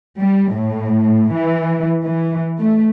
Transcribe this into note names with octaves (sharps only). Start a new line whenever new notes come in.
G3
A2
E3
E3
A3